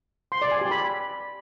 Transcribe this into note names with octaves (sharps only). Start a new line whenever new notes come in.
C6
D5
G#5
G4
B5